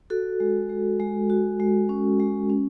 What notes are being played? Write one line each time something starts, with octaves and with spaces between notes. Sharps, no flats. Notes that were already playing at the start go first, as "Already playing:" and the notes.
F#4 A4
G#3
G#3
G#3
F#4
G#3
C#4
G#3
C#4